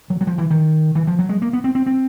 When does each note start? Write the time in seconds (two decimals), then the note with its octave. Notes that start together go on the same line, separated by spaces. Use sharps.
0.10 F#3
0.21 F#3
0.27 F3
0.38 E3
0.50 D#3
0.95 E3
1.07 F3
1.19 F#3
1.29 G#3
1.42 A#3
1.53 B3
1.64 C4
1.75 C4
1.86 C4